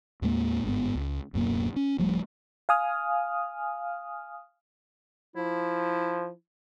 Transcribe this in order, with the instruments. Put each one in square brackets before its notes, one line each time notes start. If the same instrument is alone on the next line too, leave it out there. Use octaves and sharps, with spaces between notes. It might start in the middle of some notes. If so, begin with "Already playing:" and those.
[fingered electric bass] D#2 A2 G#3 A#3
G1 G#2 C3 B3
C#2
D1 F#2 B2 A#3
C#4
D1 F3 G3 A3
[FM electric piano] F5 G#5 D#6 F6
[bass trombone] F3 [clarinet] E4